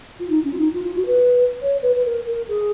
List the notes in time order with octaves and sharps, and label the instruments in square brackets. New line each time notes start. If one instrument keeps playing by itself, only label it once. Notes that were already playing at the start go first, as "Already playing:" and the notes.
[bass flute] F4
D#4
C#4
F4
D#4
F4
F4
F#4
B4
C#5
B4
B4
A#4
A#4
G#4